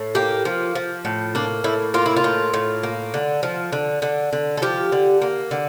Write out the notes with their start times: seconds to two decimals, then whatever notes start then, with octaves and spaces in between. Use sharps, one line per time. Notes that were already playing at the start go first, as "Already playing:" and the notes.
Already playing: A2
0.15 A#3 G4
0.45 F3
0.75 F3
1.05 A2
1.35 A#3 D4
1.64 A2 E4
1.94 A#3 F4
2.06 E4
2.16 F4
2.24 A2
2.54 A2
2.83 A#3
3.14 D3
3.43 F3
3.72 D3
4.02 D3
4.33 D3
4.57 A4
4.62 F3 G4
4.92 D3
5.22 A#3
5.51 D3